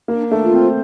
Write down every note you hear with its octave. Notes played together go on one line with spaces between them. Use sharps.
A#3 D4
D4
A3
F4
C4
C5